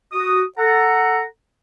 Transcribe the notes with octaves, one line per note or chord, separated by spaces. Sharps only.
F#4 D#6
A4 F#5 A#5